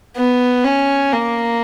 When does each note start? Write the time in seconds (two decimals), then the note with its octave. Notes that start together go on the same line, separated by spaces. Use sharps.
0.17 B3
0.64 C#4
1.13 A#3